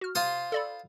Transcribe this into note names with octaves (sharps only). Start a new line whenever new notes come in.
F#4 F6
C3 F4 C5 D#6
A4 D5 B5